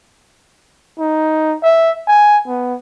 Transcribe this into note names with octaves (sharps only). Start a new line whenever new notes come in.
D#4
E5
G#5
B3